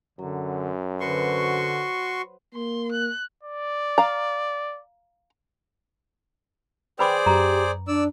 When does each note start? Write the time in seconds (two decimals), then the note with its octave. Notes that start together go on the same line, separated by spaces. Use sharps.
0.19 F#2 D3 F#3
1.00 D3 F#4 B4 C5 C6 C#6
2.55 A#3 C6
2.92 F#6
3.43 D5
3.98 F5 A#5
6.99 G#4 B4 C5 D5 G5 B5 D6
7.26 F#2 G4 A#5
7.88 D4 D5 E6